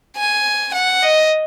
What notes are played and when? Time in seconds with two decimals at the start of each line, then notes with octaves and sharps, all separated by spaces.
0.16 G#5
0.73 F#5
1.03 D#5